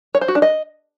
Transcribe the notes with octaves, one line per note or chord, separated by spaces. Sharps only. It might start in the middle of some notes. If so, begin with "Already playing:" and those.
C#5
C5
F#4
D4
D#5